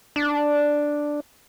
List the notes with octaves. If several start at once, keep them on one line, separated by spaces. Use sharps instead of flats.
D4